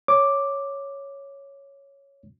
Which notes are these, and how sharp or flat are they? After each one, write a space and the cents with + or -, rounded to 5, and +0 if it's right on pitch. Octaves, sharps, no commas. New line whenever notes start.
C#5 +0 D6 +0